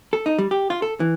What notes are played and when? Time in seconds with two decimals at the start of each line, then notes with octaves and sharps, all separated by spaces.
0.13 A4
0.26 D#4
0.38 G3
0.51 G4
0.70 F4
0.82 A4
1.00 E3